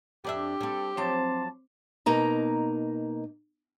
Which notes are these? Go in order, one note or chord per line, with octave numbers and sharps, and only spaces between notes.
F2 D4 G4 E5
G3 C4 A4
F3 F#3 C4 C5 A5 D6
B2 A#3 D#4 A#5